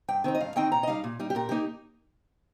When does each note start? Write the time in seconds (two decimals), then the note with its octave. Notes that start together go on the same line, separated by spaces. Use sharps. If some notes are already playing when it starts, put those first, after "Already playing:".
0.08 G2 G5
0.24 D#3 C4 D#4
0.35 D#5
0.40 G2 F5
0.56 D#3 C4 D#4 G5
0.72 A#2 A#5
0.83 D#5
0.87 G3 D#4 F5
1.04 A#2
1.20 G3 D#4
1.30 G4
1.35 A#2 A#4
1.49 A#3 D#4 G4